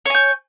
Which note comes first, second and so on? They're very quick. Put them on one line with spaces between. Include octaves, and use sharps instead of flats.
C#5 G#5 G6